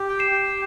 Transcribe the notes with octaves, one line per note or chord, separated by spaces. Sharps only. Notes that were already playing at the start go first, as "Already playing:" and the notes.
Already playing: G4
G5
C7 E7
G4